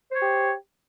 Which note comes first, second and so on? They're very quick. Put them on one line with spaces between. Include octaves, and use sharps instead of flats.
C5 C#5 G4